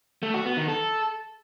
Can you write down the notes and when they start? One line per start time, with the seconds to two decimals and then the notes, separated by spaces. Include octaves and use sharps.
0.23 A3
0.34 F#4
0.45 B3
0.57 D#3
0.68 A4